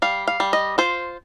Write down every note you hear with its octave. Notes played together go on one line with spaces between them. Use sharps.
G3 F5
F5
G3
D#5
F4 C5